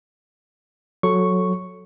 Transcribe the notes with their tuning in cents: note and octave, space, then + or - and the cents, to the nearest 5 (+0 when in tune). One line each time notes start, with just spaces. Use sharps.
F#3 -10 A4 -5 C#6 +0